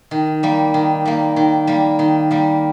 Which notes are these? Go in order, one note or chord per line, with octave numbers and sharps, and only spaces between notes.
D#3
G3 A#3
D#3
G3 A#3
D#3
G3 A#3
D#3
G3 A#3